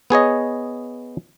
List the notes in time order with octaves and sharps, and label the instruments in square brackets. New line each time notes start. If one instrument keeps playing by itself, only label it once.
[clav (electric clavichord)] B3 G#4 C#5 D#5